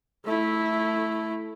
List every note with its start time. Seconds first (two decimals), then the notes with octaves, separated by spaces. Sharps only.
0.25 A3 E4